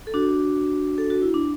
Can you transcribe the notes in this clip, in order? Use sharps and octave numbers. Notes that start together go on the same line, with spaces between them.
A4
D4 F#4
A4
F#4
E4
D4